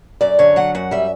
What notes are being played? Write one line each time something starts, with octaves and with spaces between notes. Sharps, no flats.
F#2 D5
D3 C#5
F#3 F#5
F#2 F#5
G3 E5